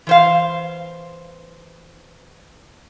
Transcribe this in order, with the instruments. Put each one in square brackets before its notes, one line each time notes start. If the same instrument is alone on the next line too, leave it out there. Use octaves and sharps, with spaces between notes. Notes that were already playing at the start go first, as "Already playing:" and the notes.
[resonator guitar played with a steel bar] E3 C5 F5